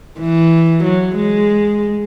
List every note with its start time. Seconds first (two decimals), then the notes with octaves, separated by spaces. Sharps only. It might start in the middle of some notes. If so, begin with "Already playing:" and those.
0.19 E3
0.84 F#3
1.16 G#3